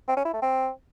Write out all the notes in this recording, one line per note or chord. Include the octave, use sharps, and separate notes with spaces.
C4
C#4
E4
A3
C4